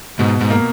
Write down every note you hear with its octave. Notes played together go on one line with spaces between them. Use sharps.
G#2 B2
G#2
A#3